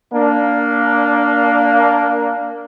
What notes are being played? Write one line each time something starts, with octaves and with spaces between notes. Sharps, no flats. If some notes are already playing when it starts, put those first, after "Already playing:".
A#3 D4